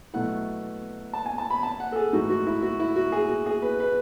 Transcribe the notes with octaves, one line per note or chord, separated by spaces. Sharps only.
B2 F#3 A3 E4 F#5
A5
G#5
A5
B5
A5
F#5
A4
G#4
G#2 E3 A3 D#4 F#4
F#4
E4
F#4
E4
F#4
G#4
F#4
G#4
B4
B4